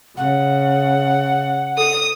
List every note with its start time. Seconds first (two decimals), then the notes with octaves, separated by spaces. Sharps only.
0.17 C#3 F#5
1.77 A4 D#6